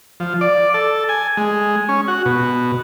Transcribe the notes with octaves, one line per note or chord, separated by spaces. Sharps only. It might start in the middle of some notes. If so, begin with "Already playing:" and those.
F3
D5
A4
G#5
G#3
C#4
F#4
B2